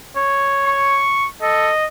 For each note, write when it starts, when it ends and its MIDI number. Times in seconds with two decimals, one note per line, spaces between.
0.16 1.02 73
0.66 1.28 85
1.42 1.70 69
1.42 1.86 75